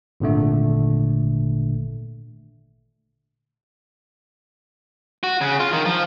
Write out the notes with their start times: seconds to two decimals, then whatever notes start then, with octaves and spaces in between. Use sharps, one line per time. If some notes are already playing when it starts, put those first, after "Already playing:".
0.20 G#1 A#2 D3 A3
5.23 F#4
5.41 C#3
5.60 F4
5.73 D#3
5.86 F3